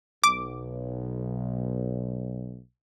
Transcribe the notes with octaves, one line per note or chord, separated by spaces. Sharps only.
B1 D6